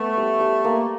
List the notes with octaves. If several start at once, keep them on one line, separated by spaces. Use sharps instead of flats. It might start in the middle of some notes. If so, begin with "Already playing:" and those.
Already playing: A3 B3
G3
G3
A#3